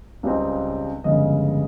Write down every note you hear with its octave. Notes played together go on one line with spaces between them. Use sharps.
C#2 C#3 G3 C4 D#4
G1 F2 C#3 G#3 D#5